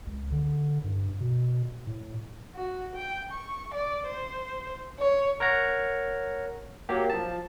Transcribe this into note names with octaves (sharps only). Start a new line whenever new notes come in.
C#2
D3
G2
B2
A2
F#4
G5
C#6
D5
C5
C#5
A#4 C#5 F#5 A#5
F#3 A#3 G4
F3 A5